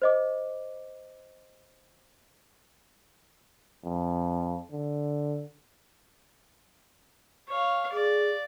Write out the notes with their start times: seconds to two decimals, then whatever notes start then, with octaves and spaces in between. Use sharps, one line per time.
0.02 C5 D#5 D6
3.84 F2
4.71 D3
7.49 C#5 F5
7.93 G#4 D5